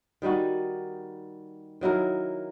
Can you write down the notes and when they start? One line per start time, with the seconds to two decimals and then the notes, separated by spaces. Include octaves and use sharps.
0.22 D#3 G3 D#4 F#4
1.81 D#3 F#3 E4 A#4